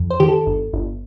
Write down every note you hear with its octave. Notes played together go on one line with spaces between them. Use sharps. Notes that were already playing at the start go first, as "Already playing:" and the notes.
Already playing: F2
C5
D#3 G4
A4
G1
G1